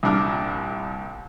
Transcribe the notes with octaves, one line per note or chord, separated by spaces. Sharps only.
C2 A#2 D4 D6 F6